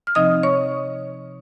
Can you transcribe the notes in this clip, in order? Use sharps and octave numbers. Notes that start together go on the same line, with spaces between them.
F6
C3 F3 C4 D#4 D#5 D#6
C#5 C#6